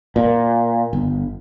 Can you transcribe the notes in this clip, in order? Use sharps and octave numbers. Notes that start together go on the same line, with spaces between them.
A#2
G1